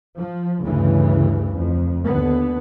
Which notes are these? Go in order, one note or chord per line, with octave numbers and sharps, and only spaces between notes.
F3
D2 G2 C#3 E3
F2
D#2 D3 B3